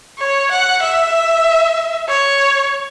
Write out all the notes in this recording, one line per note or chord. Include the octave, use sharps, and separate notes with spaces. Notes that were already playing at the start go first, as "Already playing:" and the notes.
C#5
F#5
E5
C#5